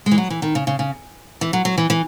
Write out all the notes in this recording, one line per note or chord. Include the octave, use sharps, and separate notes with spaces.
G#3
E3
F#3
E3
D#3
C#3
C#3
C#3
E3
F#3
F#3
E3
E3